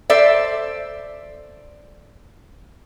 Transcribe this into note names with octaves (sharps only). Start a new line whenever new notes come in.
A4 C5 D5 E5